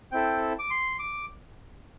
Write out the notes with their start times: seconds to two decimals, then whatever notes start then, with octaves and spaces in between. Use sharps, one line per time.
0.12 C4 E4 A4 G5
0.59 D6
0.70 C6
0.99 D6